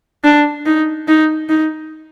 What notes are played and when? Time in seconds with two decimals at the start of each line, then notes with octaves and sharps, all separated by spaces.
0.24 D4
0.66 D#4
1.08 D#4
1.49 D#4